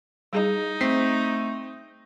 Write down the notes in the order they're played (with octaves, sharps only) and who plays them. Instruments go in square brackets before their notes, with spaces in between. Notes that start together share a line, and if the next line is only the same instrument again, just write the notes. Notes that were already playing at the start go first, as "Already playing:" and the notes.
[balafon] G3 G#4 D#5 [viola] D#4
[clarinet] A3 [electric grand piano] C4 B6 C7